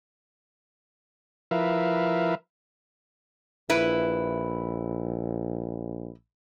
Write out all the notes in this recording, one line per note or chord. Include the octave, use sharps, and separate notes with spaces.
F3 E4 A#4 B4 E5 F5
A#1 E4 B4